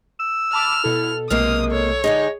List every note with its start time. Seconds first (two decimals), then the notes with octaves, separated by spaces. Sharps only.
0.20 E6
0.53 A5 B5 D6 F6
0.84 B2 E4 A4
1.30 B1 C3 G#3 A#3 D#6 F6
1.71 A4 C#5
2.04 D3 G#3 D#4 G#4 D#5